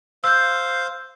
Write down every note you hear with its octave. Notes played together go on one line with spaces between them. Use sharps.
C5 F5 E6 G6